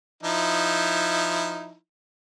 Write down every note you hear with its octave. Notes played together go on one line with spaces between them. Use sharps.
F3 D#4 E4